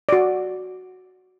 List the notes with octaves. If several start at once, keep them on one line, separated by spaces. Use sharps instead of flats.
F#4 D5